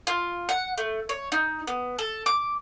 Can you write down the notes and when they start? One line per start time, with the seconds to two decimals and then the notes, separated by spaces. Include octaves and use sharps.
0.07 F4
0.49 F#5
0.78 A3
1.09 C#5
1.32 D#4
1.67 B3
1.99 A4
2.26 D6